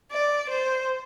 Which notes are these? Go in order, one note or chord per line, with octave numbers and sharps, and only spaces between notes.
D5
C5